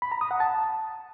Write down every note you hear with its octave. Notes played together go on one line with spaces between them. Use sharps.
B5
A#5
D#6
F#5
A5